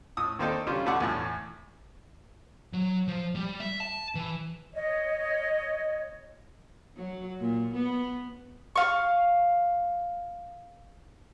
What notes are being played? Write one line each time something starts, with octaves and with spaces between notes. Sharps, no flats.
A2 D#6 E6
D#3 A#3 C4 D4 D#4 A4
C#3 G3 C#4 D4 F4
B2 D3 A3 D5 F#5
E2 A2
F#3
F3
G3
E5
A5
E3
C#5 D#5
F#3
A#2
B3
F5 C#6